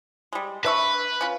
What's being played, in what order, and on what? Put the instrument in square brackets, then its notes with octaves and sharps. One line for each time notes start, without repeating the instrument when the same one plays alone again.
[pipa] G3 G#3
[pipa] D4 E5 C#6 [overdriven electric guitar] B4
[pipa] C#4 F4